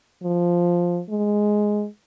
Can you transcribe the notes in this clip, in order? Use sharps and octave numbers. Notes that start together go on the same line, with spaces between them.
F3
G#3